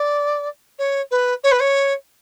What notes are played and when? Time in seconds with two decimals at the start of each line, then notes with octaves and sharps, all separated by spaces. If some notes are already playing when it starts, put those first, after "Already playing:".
Already playing: D5
0.79 C#5
1.11 B4
1.44 C#5
1.52 B4
1.60 C#5